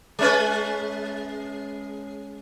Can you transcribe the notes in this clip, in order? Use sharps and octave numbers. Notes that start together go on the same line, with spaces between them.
G#3 C#4 B4